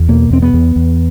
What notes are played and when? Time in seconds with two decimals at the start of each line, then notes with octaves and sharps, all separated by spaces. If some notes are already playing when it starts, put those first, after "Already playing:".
Already playing: E2
0.09 B2 A#3
0.30 E2 C4
0.42 B3
0.53 E2
0.76 E2